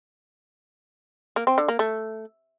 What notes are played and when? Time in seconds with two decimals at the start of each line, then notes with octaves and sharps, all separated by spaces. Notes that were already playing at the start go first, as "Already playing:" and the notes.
1.36 A#3
1.47 C4
1.58 D3
1.68 A#3
1.79 A3